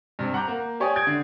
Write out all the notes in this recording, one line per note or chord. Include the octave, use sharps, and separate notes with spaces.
G2 C3
F#5 A#5 D6 G6
A#3
G4 C#5 D5 G#5 D#6
D#6 G6 G#6 D7
D3